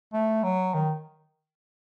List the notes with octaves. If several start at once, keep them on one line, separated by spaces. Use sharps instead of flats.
A3
F#3
D#3